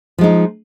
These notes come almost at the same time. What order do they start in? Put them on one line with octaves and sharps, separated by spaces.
F3 G#3 D#4